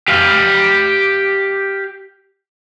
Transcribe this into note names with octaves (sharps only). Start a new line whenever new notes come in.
G4 F5